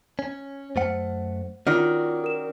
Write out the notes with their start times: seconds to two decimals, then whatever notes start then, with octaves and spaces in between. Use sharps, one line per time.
0.19 C#4
0.76 F#2 A3 C5 F#5
1.67 D#3 C#4 F4 F#4 D5
2.24 A#4 E7